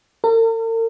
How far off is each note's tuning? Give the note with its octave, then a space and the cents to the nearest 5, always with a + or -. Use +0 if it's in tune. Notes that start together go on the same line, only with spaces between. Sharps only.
A#4 -45